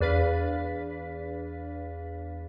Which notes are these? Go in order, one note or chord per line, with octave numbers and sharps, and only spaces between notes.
E2 D4 B4 F5 B6